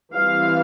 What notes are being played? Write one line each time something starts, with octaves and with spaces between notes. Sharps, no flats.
E3 G3 C4 E4 F5